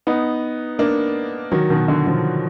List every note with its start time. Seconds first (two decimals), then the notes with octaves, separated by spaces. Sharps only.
0.07 B3 D#4
0.79 A#3 D4
1.52 D#3 F#3
1.70 B2 D#3
1.88 D3
2.07 D3 F3